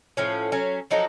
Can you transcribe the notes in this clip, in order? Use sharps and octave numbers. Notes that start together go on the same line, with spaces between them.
A2 F3 C#4
F#3 C#4
F3 F#3 D#4 A4